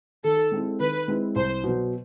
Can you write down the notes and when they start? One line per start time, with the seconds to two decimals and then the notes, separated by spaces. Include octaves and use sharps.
0.24 D#3 A4
0.52 G#3 C4 E4
0.80 D#3 B4
1.08 G#3 C4 E4
1.36 C2 C5
1.64 B2 F#3